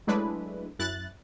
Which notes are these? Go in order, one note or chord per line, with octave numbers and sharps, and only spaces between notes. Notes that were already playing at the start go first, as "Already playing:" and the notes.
F#3 G#3 A3 D4 E4 B4
F#2 E4 F#6 A6